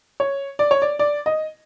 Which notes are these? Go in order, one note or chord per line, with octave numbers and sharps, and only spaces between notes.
C#5
D5
C#5
D5
D5
D#5